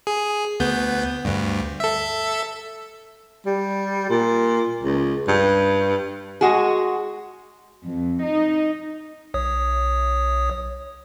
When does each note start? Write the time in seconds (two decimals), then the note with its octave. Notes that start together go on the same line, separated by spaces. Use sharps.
0.07 G#4
0.60 D2 B3 G6
1.25 D2 G2
1.80 A4 E5
3.46 G3
4.10 A#2
4.83 C#2
5.28 G2
6.41 G#3 F#4 G#4
7.84 F2
8.23 D#4
9.34 B1 C#5 D#6